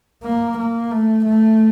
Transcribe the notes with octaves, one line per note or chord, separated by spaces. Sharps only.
A#3
A#3
A3
A3